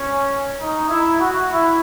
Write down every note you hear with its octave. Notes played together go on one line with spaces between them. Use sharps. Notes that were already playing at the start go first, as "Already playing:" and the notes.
Already playing: C#4
D#4
E4
F#4
E4